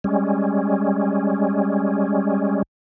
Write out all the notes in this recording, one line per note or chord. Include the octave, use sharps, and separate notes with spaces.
G3 G#3 C#4